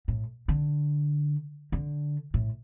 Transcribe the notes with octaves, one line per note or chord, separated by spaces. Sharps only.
A2
D3
D3
A2